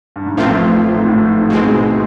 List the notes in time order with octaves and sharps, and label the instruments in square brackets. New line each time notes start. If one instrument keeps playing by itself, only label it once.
[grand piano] G2
G#2
[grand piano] A1 A2 [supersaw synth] F3 A3 C4 F4
[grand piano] G#2
A2
G#2
[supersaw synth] B2 G#3 C4